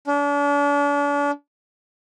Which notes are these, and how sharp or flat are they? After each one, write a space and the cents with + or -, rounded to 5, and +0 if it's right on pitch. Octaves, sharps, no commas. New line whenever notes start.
D4 -40